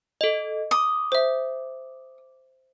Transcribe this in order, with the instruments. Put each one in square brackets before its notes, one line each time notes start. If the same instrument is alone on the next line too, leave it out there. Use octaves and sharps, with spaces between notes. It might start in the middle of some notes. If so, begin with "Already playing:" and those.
[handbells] A4 D#5
[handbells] D6 [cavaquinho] D#6
[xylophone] C5 E5